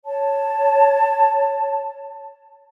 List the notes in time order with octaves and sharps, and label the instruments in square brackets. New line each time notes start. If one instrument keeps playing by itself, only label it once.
[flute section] C#5 A5